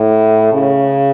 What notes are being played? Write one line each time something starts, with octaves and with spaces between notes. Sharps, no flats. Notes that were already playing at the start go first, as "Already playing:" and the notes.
Already playing: A2
C#3